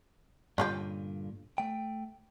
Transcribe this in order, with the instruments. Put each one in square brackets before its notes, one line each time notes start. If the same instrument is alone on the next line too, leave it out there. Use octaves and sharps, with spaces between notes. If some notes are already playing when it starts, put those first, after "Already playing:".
[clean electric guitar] G2 A#2 D3 [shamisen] C#4 F4 G4
[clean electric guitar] A3 G5